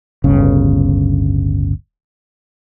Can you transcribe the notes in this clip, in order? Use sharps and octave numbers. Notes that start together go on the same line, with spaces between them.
D1 G1 C#3